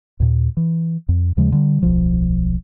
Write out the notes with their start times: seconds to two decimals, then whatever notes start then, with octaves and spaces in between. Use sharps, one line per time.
0.20 D#2 A#2
0.57 E3
1.09 F2
1.37 D#2 C#3 F3 G#3
1.52 D3 G3
1.83 D1 B1 F3